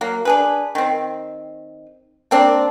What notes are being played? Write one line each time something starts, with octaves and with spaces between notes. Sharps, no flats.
F#3 A#3
D4 G#4 B4
D#3 C4
A#3 C4 D4